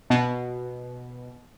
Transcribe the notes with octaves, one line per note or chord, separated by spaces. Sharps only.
B2